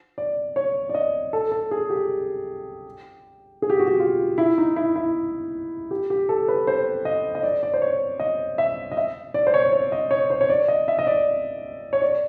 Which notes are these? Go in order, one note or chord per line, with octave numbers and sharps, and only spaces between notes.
D5
C#5
D5
D#5
A4
A4
G#4
G4
G#4
G4
F#4
G4
F4
E4
D#4
E4
E4
G4
G4
A4
B4
C5
D#5
D#5
D5
D5
C5
C#5
D#5
E5
D#5
E5
D5
C5
C#5
C#5
D#5
C#5
C5
C#5
D5
D#5
E5
D#5
D5
C#5
D5